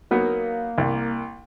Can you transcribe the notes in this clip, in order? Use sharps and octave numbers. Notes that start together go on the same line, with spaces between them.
F#3 A#3 B3 D#4
C2